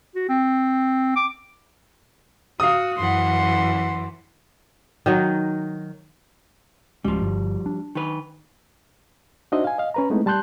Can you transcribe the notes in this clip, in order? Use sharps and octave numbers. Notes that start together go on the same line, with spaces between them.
F#4
C4
D6
F#4 F5 D#6
F#2 E3 F#5 C6
D#3 F#3 D#5
D1 F3 G3 G#3 C#4
G1
D4
D#3 B4
D4 D#4 F#4 C5 D#5 E5
F5 G#5
D#5 F5
C#4 B4 A#5
G#3 A3 B3 C4 D#4 E4
G3 A5 C6 F#6 G6